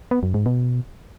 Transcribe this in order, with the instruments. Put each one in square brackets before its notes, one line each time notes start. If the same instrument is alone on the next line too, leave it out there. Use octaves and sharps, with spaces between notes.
[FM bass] B3
F#2
G#2
B2